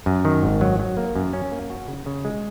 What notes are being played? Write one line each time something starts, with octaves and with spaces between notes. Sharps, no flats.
F#2
D#3
G#1
F#3
F#3
A#3
F#2
C#4
A#3
F#4
C#3
C#3
G#3